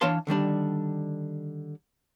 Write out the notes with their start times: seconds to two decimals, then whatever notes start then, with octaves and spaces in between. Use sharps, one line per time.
0.01 E3 D4 C#5 F5 A5 C6
0.27 D3 D#3 G3 D4